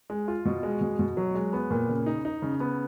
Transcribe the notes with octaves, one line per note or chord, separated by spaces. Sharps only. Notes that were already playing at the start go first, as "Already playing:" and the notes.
G#3
F4
B2
G#3
B2
B2
F#3
G#3
B3
A#2
C#3
D#4
D#4
C#3
B3